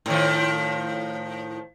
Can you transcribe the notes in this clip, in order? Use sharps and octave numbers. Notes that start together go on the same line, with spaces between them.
A2 D#3 F3